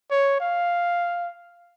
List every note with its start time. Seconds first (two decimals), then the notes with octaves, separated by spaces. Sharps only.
0.10 C#5
0.40 F5